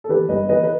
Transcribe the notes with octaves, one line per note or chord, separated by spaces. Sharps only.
A4
E3 G4 B4
G1 B4 D#5
E3 B4 D#5
B4